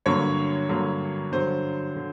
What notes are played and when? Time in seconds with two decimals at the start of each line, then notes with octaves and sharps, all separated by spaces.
0.06 G2 D3 F#3 A#3 C#5
0.69 G2 D3 F#3 A#3
1.32 G2 D3 F#3 C5
1.96 D3